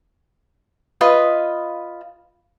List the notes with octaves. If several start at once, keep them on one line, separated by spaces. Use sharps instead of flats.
F4 B4 D#5